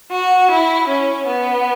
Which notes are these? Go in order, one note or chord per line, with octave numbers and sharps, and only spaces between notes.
F#4
E4
C#4
B3